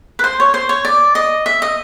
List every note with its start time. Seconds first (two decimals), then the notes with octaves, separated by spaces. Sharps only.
0.19 B4
0.24 C5
0.40 C#5
0.54 C5
0.69 C#5
0.85 D5
1.15 D#5
1.46 E5
1.62 D#5